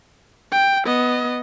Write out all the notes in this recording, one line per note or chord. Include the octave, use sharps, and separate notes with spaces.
G5
B3 D#5